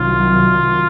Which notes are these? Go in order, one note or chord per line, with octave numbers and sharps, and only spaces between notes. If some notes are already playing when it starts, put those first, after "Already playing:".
Already playing: C2 C3 D#3 F#3 F4